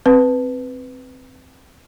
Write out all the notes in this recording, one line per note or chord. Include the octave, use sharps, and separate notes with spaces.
C4 B4